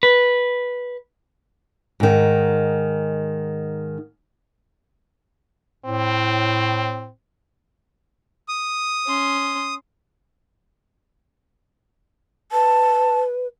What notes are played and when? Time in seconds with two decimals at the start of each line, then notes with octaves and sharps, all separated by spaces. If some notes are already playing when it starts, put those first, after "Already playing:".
0.03 B4
2.00 G#2 D#3
5.85 A2 C4
8.48 D#6
9.07 C#4 C6
12.52 B4 A5